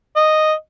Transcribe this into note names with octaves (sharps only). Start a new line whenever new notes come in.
D#5